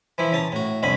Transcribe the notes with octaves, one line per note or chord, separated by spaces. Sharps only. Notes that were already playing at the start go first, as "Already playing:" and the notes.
E3 F3 E4
C#3 A5 A#5
A2 F#4
C2 F2 D3 C#4 B5